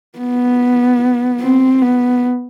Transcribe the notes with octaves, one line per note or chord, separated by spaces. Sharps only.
B3
C4
B3